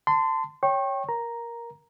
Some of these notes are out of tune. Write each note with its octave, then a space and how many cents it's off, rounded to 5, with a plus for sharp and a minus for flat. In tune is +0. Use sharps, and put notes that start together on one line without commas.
A5 +25 C6 -25
C#5 +0 G5 +0 C#6 -35
A#4 +10 A#5 +0